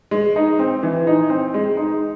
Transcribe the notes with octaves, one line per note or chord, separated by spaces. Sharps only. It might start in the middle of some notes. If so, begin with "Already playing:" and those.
G#3
D#4
C4
E3
D#4
C4
G#3
D#4